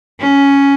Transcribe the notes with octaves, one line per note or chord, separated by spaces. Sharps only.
C#4